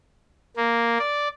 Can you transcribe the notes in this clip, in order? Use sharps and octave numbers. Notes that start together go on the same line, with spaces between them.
A#3
D5